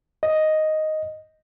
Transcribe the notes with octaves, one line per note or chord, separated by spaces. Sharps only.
D#5